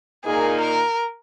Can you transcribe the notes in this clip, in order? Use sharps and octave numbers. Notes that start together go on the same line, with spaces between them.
A#2 A#3 D#4 G#4
A#4